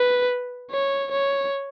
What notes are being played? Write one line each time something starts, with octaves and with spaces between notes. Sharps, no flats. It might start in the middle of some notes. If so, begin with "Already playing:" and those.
Already playing: B4
C#5
C#5